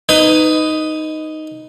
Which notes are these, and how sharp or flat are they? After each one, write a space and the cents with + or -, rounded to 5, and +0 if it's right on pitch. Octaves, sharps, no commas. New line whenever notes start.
D#4 +0 B4 +25